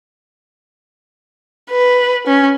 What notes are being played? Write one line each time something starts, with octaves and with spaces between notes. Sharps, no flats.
B4
C#4